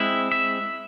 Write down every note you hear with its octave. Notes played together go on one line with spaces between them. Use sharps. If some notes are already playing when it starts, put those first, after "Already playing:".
Already playing: G#3 C4 E4 E5
E5